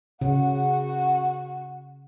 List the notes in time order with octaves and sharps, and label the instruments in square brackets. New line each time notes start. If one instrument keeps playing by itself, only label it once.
[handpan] C#3 [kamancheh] F#4 F#5